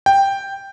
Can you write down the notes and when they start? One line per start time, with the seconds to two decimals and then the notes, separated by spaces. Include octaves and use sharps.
0.06 G5